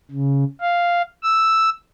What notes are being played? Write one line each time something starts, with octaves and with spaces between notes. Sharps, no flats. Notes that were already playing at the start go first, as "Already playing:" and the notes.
C#3
F5
E6